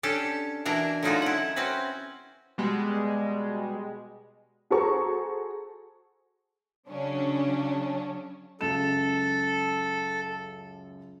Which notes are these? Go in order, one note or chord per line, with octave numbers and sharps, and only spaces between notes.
C#4 D4 G4 A4 A5
B2 E3 D4 E4 A#4 A#5
D3 F#3 C#4 D#4 F4 F#4
E4 F#5
C4 C#4 F#4 B4
B2 G3 G#3
F#4 G#4 A4 C5 A#5 C#6
C#3 F#3 C#4 D4
C#2 F#2 A4 E7